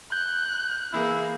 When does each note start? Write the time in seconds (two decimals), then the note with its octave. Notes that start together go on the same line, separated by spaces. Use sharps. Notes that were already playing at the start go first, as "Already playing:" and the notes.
0.12 F#6 G6
0.92 E3 A#3 E4 G#4